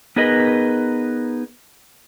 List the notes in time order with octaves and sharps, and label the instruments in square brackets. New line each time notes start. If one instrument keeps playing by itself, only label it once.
[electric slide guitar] B3 D#4 G#4 A#4 B4 D#5